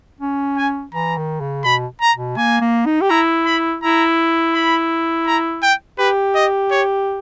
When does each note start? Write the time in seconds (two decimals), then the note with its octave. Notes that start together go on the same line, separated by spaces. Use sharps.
0.20 C#4
0.57 G#5
0.93 E3 A#5
1.17 D#3
1.40 C#3
1.65 B2 B5
2.01 A#5
2.14 B2
2.37 A#3 G#5
2.61 A#3
2.86 D#4
3.01 G4
3.10 E4 A#5
3.46 B5
3.81 E4 A#5
4.54 B5
5.26 A#5
5.63 G5
5.99 G4 B4
6.35 D#5
6.71 C#5